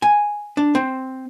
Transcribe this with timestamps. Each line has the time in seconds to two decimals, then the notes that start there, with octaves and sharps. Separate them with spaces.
0.02 G#5
0.57 D4
0.75 C4